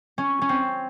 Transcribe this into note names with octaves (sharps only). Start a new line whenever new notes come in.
C#4
C#4
C4